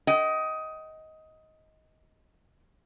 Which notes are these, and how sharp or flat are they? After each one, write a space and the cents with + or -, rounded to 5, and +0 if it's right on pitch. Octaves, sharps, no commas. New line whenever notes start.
D#5 +15 G5 -35